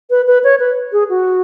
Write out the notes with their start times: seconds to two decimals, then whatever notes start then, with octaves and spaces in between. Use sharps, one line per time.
0.10 B4
0.27 B4
0.44 C#5
0.60 B4
0.92 G#4
1.09 F#4